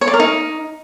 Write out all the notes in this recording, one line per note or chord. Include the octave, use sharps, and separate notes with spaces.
C#5
D5
A#4
D#4